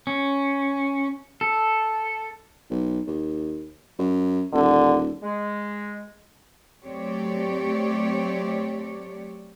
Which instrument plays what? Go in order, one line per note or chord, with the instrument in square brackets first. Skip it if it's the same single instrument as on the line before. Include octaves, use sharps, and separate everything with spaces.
[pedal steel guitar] C#4
A4
[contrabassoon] B1
D#2
F#2
[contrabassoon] D#1 [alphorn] D3
[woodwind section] G#3
[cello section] F#3 A3 C4 G4 C#5 D5